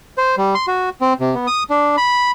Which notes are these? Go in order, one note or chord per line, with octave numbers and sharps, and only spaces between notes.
C5
G3
C6
F#4
C4
C3
B3
D#6
D4
B5